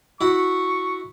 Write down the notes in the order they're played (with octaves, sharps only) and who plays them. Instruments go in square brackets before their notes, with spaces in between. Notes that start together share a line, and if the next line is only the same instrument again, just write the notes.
[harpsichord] E4 F#4 [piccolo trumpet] C#6